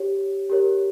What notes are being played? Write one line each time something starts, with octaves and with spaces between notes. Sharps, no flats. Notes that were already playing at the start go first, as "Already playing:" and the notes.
Already playing: G4 C#5
G4 A#4 C#5